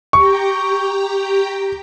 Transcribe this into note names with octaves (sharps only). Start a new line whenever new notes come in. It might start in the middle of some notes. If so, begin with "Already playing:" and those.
G4 G5 A#5 C#6